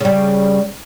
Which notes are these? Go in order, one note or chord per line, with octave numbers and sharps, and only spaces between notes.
C#3 G3